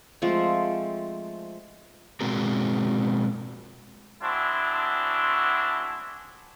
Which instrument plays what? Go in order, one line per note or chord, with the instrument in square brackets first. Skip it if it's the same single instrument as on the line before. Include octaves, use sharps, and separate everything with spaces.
[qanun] F3 G#3 A3 C4
[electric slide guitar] B2 G#3 C4 F#4 G#4 A#4
[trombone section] G#3 C4 D4 E4 F#4